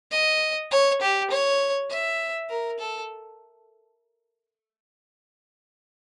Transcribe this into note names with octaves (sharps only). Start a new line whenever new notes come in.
D#5
C#5
G4
C#5
E5
A#4
A4